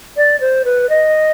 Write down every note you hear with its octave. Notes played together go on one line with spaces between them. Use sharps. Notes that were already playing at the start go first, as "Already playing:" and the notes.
D5
C5
B4
D#5